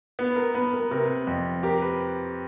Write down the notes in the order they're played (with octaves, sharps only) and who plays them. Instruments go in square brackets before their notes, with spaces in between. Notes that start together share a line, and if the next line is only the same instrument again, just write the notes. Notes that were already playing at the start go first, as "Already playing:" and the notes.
[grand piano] B3 [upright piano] B4
[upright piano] A#4
[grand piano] B3 [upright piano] B4
[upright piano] A#4
[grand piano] C3 [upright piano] A#4
[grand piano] F2
[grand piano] G4 [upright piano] A#4
[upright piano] B4